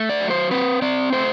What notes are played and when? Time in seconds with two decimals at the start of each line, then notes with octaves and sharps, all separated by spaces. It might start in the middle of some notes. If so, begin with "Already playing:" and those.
Already playing: A3
0.09 D5
0.20 F#3
0.30 C5
0.51 C4 B4
0.82 C4 D5
1.13 A3 C5